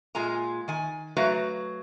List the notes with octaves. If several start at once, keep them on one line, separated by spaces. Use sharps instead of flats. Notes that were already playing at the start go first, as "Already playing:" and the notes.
A#2 G#3 F4 G#5 A#5
D#3 G#5
F#3 A3 F#4 B4 F5 A#5